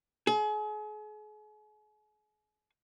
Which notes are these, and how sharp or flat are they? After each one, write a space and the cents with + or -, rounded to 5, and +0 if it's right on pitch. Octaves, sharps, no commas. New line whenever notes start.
G#4 +40